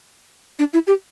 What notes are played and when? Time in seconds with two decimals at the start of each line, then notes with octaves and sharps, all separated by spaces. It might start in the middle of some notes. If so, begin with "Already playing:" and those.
0.59 D4
0.73 E4
0.87 G4